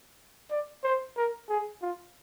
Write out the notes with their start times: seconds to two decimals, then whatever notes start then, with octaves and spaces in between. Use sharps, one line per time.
0.51 D5
0.84 C5
1.17 A#4
1.49 G#4
1.82 F4